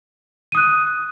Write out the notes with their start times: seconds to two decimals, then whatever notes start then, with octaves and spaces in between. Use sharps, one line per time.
0.52 D#7
0.55 D#6
0.57 F#6